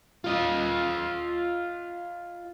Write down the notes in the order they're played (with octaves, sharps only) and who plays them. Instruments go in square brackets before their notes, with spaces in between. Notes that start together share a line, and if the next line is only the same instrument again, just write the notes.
[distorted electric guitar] F4 D#5